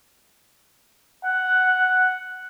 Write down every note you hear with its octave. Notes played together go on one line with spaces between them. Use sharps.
F#5